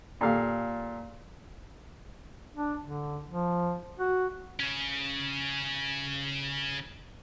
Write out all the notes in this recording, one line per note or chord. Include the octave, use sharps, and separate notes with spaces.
A#2 G4 A4 F5
D4
D3
F3
F#4
C#3 C#4